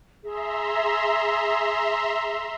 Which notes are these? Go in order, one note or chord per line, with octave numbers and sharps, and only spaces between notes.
G#4 E5 A#5 C6